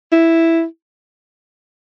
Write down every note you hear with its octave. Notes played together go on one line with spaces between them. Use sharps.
E4